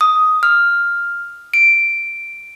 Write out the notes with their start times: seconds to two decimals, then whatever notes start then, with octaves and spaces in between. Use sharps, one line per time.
0.01 D#6
0.43 F6
1.54 D7